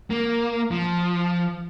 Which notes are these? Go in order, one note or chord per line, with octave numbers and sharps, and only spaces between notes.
A#3
F3